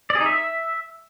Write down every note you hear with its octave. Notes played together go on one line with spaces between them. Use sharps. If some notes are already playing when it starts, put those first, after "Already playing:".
D5
G#4
D#4
E5